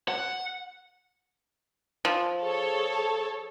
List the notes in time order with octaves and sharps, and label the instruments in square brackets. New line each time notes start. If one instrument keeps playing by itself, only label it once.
[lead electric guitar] F#5
[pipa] F3
[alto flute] G#4 [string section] A4 C#5